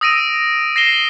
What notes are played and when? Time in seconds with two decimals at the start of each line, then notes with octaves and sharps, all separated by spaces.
0.01 D#6 E6 A#6 D7 D#7
0.76 A#6 C7 E7 G7